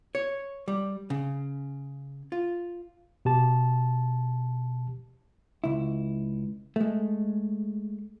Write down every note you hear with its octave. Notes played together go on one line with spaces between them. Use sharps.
C#5
G3
C#3
F4
B2 G4 A5
C#2 E4
G#3 A3